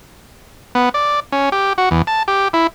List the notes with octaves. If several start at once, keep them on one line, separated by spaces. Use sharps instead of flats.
B3
D5
C#4
G4
F#4
E2
A5
G4
E4